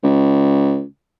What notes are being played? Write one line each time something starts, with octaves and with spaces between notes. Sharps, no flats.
C#2